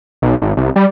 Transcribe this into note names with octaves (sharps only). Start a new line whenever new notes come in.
B1
G#1
C2
G3